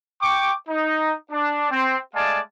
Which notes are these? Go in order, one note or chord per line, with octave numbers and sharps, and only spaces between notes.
G5 C#6 D6
D#4
D4
C4
G#3 A3 D5 F5 G#5 A5